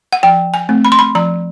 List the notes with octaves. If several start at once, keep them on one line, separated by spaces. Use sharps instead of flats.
F#5
F3 G5
G#5
A3 C4
B5
C6
B5
F3 A#5